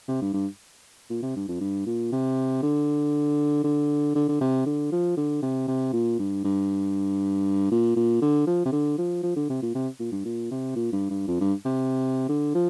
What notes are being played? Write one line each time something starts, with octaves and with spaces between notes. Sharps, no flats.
C3
G2
G2
A#2
C3
G2
F2
G2
A#2
C3
D3
D3
D3
D3
C3
D3
F3
D3
C3
C3
A#2
G2
G2
A#2
A#2
D3
F3
C3
D3
F3
F3
D3
C3
A#2
C3
A#2
G2
A#2
C3
A#2
G2
G2
F2
G2
C3
D3
F3